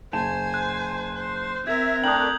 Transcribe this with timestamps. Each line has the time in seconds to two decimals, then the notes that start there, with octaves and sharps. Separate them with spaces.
0.13 F#1 C5 G#5 A5 E7
0.54 F#6
1.15 C5
1.67 C4 A#4 E5 G#6
2.04 A3 D4 G5 A#5 D#6 G6 F#7